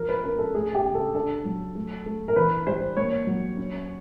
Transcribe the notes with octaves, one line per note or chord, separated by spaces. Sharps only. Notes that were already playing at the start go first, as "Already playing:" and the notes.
Already playing: F3 A#4
B4
C#4 A#4
A4
A3 G#4
G4
C#3
A4
D4 A4
F#3
A3
A3
A#4
E3 B4
G3 C5
A#3 C#5
F#3
C#4